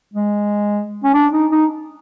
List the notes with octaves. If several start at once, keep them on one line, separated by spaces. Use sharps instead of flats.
G#3
C#4
D4
D#4
D#4